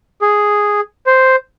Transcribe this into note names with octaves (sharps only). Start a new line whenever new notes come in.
G#4
C5